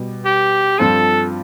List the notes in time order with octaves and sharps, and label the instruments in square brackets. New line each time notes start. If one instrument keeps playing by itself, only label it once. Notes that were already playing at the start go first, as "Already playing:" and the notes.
Already playing: [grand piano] B2 G3 B3
[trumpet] G4
[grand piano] G2 F3 C4 F4 [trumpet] A4